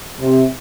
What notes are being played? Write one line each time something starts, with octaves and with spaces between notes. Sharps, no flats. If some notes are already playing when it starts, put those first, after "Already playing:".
C3